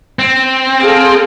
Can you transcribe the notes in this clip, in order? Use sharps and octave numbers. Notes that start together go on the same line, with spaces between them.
C4
G#4 A4 F5